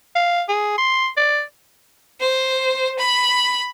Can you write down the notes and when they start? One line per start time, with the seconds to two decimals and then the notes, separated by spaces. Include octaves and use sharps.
0.16 F5
0.49 G#4
0.78 C6
1.17 D5
2.20 C5
2.99 B5